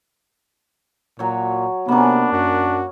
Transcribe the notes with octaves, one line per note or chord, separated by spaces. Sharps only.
A#2 F#3 C#5
C3 A#3 B3 C#4 D4
F#2 F#4